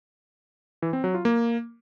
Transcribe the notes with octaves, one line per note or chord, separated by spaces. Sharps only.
E3
C4
F#3
F4
A#3